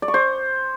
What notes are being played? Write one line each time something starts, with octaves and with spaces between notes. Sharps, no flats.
D5
C#6
C5